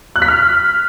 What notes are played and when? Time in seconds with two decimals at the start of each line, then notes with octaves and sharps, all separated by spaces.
0.16 F#6
0.22 B6
0.28 F6